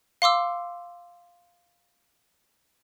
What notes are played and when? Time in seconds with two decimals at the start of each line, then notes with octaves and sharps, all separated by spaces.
0.22 F5 C6 D6 E6